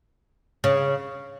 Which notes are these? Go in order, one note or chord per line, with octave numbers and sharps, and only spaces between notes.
C#3